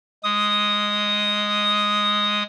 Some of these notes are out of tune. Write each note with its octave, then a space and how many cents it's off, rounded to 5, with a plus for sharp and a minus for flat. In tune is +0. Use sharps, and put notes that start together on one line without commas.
G#3 +0 D#6 +0